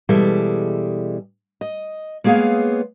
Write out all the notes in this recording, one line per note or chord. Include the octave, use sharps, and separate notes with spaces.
B2 E3 G3 G#3 A4 E5
D#5
G#3 A#3 B3 G#4 C#5 F5